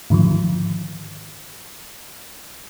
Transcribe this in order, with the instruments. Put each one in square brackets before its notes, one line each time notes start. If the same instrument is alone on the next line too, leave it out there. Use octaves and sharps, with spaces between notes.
[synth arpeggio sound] G#2 D3 D#3 F3